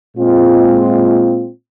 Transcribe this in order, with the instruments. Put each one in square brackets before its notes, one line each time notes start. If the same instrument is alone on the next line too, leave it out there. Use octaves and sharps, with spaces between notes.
[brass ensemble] A#2 G#3 C4 F4